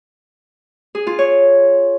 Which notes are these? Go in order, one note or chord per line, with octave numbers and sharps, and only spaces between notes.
G#4
F4
C#5